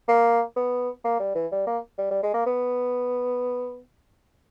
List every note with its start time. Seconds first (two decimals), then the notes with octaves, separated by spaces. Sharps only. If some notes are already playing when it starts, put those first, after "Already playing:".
0.08 A#3
0.56 B3
1.04 A#3
1.20 G3
1.35 E3
1.52 G3
1.67 A#3
1.98 G3
2.11 G3
2.23 G#3
2.34 A#3
2.46 B3